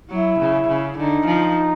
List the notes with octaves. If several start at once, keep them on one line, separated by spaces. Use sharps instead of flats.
F#3 E4
C#3
C#3
D3 D#4
F3